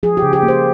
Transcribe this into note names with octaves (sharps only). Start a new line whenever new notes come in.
F3 G#4
G4
C#3
G4
A#3
C5